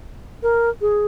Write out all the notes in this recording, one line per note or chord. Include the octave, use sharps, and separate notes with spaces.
A#4
G#4